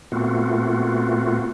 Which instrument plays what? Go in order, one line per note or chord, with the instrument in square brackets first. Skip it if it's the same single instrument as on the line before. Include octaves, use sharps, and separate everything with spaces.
[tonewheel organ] A#2 A3 B3 C4 F4 F#4